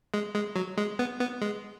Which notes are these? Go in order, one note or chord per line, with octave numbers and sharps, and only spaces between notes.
G#3
G#3
F#3
G#3
B3
B3
G#3